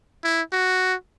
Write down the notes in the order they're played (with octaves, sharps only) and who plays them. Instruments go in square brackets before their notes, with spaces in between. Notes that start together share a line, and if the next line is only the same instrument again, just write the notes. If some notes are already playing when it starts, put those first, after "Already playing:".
[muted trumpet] E4
F#4